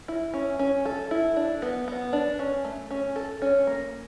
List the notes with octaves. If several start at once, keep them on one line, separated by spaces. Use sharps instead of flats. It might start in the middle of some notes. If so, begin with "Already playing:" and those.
E4
C#4
C#4
A4
E4
D4
B3
B3
D4
C#4
A3
C#4
A4
C#4
A#3